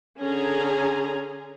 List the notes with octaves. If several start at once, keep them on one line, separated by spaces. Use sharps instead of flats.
D3 C#4 G#4 G#5 A#5